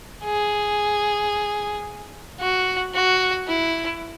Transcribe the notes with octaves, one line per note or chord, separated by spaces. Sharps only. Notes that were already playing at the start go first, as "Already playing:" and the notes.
G#4
F#4
F#4
E4